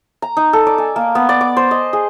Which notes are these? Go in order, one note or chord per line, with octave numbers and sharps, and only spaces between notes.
A#5
D#4
A4
D5
G#5
A#3
B3
D5
D6
C5
D#5
G#4